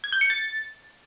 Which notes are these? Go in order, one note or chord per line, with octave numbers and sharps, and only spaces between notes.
G#6
G6
C#7
A6